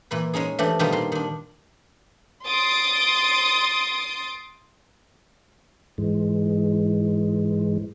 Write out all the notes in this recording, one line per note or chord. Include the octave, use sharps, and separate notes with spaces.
A#2 E3 B4
G#3 C#4 D#4 G#4
E3 F3 A3 D4 G4
B2 D#3 G3 D4 D#4 F4
A#2 D#4 C6
D#3 D4
C6 D#6 A6 D7
G#2 E3 G#3